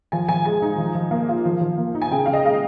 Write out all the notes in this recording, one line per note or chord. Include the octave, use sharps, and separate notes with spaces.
F3 G#5
F3 G#5
G#3 G#5
D#4
F3
F3
A#3
F4
F3
F3
A#3
D#4
G#5
C#3 G5
C#3 F5
D#5
G#3 F5